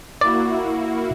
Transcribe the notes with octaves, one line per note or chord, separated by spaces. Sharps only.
A#3 E4 F#4 D5